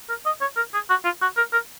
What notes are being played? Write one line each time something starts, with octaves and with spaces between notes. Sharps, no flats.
A#4
D#5
C#5
A#4
G#4
F#4
F4
F#4
A#4
A#4